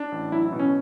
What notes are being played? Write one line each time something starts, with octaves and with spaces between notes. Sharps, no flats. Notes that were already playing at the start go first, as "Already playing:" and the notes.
Already playing: D4
A1
F#3 E4
E4
B2
C#4